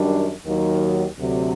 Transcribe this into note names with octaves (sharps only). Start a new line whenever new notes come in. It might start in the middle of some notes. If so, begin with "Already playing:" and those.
Already playing: F#2 D#3 G3 D4
D#2 D#3 F#3
D2 C3 F#3